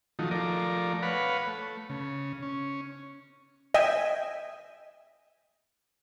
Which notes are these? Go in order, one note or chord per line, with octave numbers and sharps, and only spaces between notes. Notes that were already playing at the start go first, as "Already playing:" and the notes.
D#3 F3 F#3 A3 D#4
F3 A3 A#4 D5
B4 C#5 F5 F#5 B5
A3
C#3
C#4
D#5 E5 G5 G#5